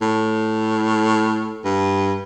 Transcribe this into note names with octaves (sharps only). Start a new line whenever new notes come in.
A2
G2